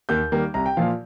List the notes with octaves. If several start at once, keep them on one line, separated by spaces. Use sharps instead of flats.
D#2 G6
D#3 G3 A#3
C2 A#5
G5
A#2 F3 F5